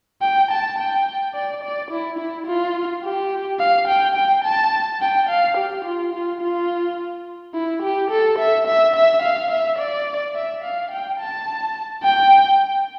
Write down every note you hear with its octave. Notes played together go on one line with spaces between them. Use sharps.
G5
A5
G5
D5
D5
E4
E4
F4
G4
F5
G5
G5
A5
G5
F5
G4
F4
F4
F4
E4
G4
A4
E5
E5
E5
F5
E5
D5
E5
F5
G5
A5
G5